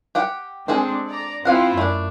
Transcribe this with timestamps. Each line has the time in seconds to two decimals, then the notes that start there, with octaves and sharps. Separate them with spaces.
0.15 G4 F#5 G5
0.68 G#3 C4 D4 G#4 A4 C5
1.08 D5 A#5
1.45 F3 C4 E4 F4 F5 F#5
1.77 F#2 A3 D4